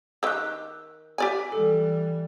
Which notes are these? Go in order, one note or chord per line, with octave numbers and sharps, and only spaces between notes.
D#3 G4 E6 F#6
G4 D5 G#5
E3 G3 A4